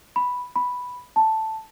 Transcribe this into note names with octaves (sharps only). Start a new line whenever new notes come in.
B5
B5
A5